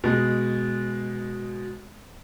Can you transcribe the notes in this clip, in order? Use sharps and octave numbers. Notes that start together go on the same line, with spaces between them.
B2 G#3